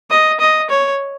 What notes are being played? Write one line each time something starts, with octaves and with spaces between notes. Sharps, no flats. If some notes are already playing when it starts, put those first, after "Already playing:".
D#5
D#5
C#5